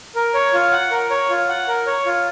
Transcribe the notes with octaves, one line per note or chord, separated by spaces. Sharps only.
A#4
C#5
F4
F#5
A#4
C#5
F4
F#5
A#4
C#5
F4